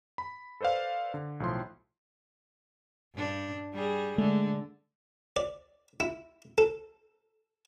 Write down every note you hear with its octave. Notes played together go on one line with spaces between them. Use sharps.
B5
A4 B4 C5 D5 F5
D3
B1 A2 F3 C6
G2 D4
G3 G#4
D3 G#3 A3
D5
E4
A4